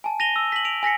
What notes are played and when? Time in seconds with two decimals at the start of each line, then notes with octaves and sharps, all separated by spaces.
0.04 G#5 A5
0.20 A#6 D#7 F7 G7
0.36 E6
0.52 B6 F#7
0.65 D7 F7
0.83 G#5 A#6 B6 C#7